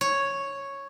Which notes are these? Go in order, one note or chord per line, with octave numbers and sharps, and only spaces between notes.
C#5